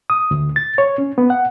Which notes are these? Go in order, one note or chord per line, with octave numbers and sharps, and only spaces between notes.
D#6
D2
A6
C#5
C#4
B3
F#5